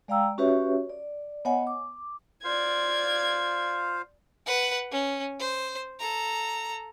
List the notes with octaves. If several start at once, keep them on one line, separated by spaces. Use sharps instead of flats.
G#3 D5 F5 G5 A#5 E6
C#4 F#4 G4 B4 C#5 E5
D5
B3 C#5 D#5 F#5 G#5
D6
F4 C5 D5 F5 G#6
B4 F#5
C#4
C5
A4 A#5